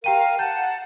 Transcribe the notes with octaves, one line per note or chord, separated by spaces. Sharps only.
G4 A#4 F5 G5 D#7
F#5 A5 G6